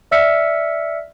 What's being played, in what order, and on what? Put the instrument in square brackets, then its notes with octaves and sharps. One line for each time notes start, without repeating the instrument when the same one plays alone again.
[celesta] D5 E5 E6 F6 B6 C#7